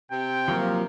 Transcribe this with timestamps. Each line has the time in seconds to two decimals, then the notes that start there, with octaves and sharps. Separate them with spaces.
0.11 C3 G5
0.48 F3 F#3 A#3